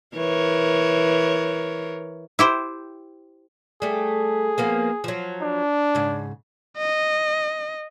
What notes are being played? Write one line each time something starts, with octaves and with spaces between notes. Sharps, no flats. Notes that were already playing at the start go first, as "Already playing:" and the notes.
E3 A#4 C#5
E4 G4 C5
G3 A3 G#4
F3 A#3 B3
F3 F#3
D4
G#2 C#3
D#5